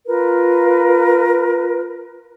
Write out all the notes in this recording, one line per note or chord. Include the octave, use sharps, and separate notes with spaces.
F4 A#4 B4